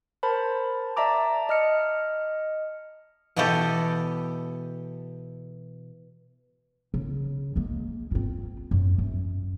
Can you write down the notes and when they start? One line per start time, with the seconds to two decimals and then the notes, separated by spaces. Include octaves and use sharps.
0.23 A#4 C5 A5 B5
0.97 D5 E5 A5 A#5 D6
1.49 D#5 F6 C#7
3.36 B2 E3 B3 F#4 G4 A4
6.94 C#3
7.56 G#3 A#3
8.11 C4 F4
8.71 F#2
8.98 F#2